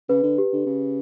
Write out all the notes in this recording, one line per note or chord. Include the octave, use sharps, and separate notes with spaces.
C#3 B4
D3
G4
D3
C#3